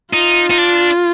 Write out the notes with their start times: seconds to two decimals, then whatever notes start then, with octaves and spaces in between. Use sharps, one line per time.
0.13 D#4 F4
0.50 D#4
0.58 D4